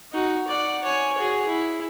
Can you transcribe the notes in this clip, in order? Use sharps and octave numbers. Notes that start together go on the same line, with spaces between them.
D#4 F#4
D5 F#5
C#5 G#5
F#4 G#4
E4